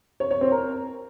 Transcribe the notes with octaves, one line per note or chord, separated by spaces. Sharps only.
C#5
C#5
C4
A#4